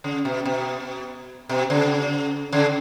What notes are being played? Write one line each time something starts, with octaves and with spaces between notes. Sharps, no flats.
C#3
B2
B2
B2
C#3
C#3